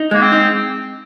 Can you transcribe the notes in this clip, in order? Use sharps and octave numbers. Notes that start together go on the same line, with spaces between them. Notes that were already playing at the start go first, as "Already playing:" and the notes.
Already playing: D#4
G#3 A#3
C4
D#4